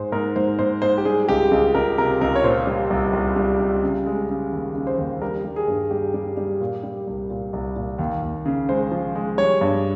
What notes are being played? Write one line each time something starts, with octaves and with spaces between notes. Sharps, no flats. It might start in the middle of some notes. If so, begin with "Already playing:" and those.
Already playing: G#2 G#3 C5
G#2 A#4
G#2 C5
G#2 C5
G#2 C5
G4
G3 G#4
C#2 G4
C#2 G#4
C#2 A#4
C3 A#4
C#2 A#4
C#5
A#2 C5
G3
C2
C2
G3
G3
C#3
G#3
C#3
D#2
C#3
C5
D#2
G3 A#4
G3
G#4
G2
G3 G4
G3
G3
A#2
G3
C2
A#2
C2
A#2
D#2
D#2
C#3
G#3 C5
F3
G#3
G3 C#5
G2